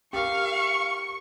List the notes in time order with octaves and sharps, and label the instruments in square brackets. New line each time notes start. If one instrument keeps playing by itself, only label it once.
[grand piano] G4 A#4 [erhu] F5 [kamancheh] C#6